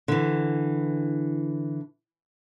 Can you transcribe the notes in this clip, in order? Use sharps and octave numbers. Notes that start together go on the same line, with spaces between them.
D3 E3